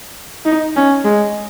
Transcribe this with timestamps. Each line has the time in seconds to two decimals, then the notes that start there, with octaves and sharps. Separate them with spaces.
0.46 D#4
0.76 C#4
1.05 G#3